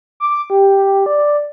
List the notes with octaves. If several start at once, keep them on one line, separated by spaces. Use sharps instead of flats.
D6
G4
D5